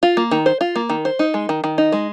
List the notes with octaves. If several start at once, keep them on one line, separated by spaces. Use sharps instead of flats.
F4
A#3
D#3
C5
F4
A#3
D#3
C5
D#4
G#3
D#3
D#3
D#4
G#3